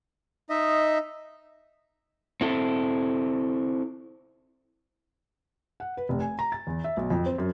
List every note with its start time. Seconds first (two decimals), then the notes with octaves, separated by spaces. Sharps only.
0.50 D#4 D#5 E5
2.41 C4 E4 A4
5.80 F#5
5.97 B4
6.09 F1
6.20 G#5
6.39 A#5
6.52 A6
6.67 E2
6.84 E5
6.97 B1
7.10 F2
7.26 C4
7.38 F#2